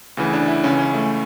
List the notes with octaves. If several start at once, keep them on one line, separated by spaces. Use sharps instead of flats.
D2 C#3 E3
D4
E4
C#2 C#3 E3 C#4
C#4
A3